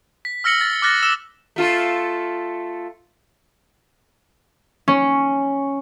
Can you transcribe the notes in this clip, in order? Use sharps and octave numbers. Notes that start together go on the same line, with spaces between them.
B6
E6 F6 A#6 C#7 F#7 G7
A6
D6 F6 F#6 A6 A#6
E6 E7 G7
A3 F4 A4
C#4